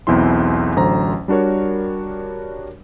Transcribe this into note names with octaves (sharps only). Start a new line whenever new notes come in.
B1 E2 C4 E4 C6
A1 D3 F#3 C5 A#5
G3 D4 F#4 A#4 C#5